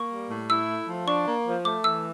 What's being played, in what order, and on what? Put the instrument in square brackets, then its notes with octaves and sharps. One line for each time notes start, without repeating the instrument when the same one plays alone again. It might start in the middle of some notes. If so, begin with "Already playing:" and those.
Already playing: [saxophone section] A#3 [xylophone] C#6
[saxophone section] G3
A2
[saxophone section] E4 [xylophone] E6
[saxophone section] A3
F3
[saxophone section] D4 [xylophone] C#6
[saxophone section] A#3
F3
[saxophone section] A3 [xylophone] D6
[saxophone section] E3 [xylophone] E6